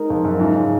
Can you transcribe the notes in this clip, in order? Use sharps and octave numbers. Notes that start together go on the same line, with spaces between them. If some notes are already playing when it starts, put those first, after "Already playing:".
Already playing: G#3 D#4 A#4
F2
F#2
G#2 C#3 G#3 C#4 F4